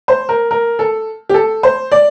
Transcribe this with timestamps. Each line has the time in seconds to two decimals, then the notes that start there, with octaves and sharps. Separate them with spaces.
0.08 C5
0.29 A#4
0.51 A#4
0.79 A4
1.29 G4
1.34 A4
1.63 C5
1.92 D5